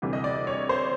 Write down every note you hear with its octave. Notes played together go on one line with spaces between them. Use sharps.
D2 C3 E3 G3
D#5
D5
C#5
C5